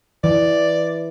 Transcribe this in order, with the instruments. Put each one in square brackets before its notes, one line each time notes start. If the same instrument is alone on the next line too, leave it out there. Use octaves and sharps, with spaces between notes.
[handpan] E3 [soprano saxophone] D5